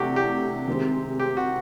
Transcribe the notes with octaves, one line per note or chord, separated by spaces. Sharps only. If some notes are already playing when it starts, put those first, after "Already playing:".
Already playing: C3 E3 A3 D4 F#4 G4
G4
C3 D#3 G#3 C4
G4
F#4